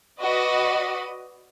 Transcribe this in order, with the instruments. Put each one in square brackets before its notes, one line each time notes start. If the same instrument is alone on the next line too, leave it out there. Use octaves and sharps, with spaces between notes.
[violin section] F#4 B4 D5 D#5